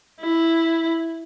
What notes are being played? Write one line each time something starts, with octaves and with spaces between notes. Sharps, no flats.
E4